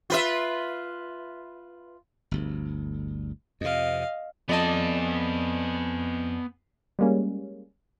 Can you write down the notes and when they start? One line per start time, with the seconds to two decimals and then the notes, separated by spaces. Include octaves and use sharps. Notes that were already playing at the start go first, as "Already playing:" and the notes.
0.10 F4 B4 E5
2.31 G1 D2
3.61 F2 C3 D#5 F5
4.49 F2 B3 D5 D#5 G#5 A5
6.99 G3 G#3 A#3 C#4